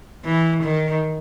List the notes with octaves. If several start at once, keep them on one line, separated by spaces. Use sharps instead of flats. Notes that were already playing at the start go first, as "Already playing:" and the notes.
E3
D#3